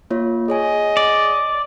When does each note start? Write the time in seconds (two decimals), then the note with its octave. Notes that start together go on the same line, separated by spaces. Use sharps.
0.10 A#3 F4 C#5
0.48 G#4 C#5 D#5 G#5
0.97 D5